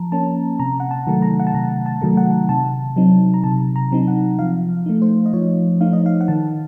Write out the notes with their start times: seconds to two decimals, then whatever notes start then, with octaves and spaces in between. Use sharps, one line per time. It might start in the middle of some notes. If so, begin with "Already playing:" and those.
Already playing: F3 A5 A#5
0.12 A#3 C#4 A5
0.59 C3 A#5
0.80 F#5
0.91 A5
1.07 D#3 F#3 A3
1.22 A#5
1.40 F#5
1.47 A5
1.54 C3 A#5
1.86 A5
2.02 D#3 F#3 A3
2.17 F#5
2.49 C3 A5
2.96 F#3 C4 D#4
3.34 A#5
3.44 C3 A5
3.76 A#5
3.91 F#3 C4 D#4
4.08 F#5
4.39 F3 F5
4.86 A3 D#4
5.02 C5
5.26 D#5
5.33 F3 C#5
5.81 A3 D#4 F5
5.93 D#5
6.06 F5
6.21 F#5
6.28 D#3 A5